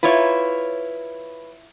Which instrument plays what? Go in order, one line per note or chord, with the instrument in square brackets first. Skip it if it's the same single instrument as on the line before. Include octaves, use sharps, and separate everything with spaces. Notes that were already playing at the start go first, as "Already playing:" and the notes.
[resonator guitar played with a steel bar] E4 F4 [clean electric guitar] B4 C#5